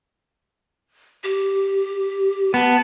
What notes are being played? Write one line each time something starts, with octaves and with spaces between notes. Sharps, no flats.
G4
B3 A5